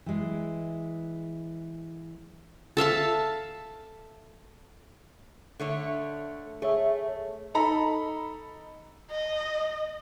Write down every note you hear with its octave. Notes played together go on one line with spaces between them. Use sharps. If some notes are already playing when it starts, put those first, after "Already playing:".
E3 G#3
A4 E5 F5 A5
D3 A3 C#5
A3 G#4 C#5 E5
D#4 A4 A#5 B5
D#5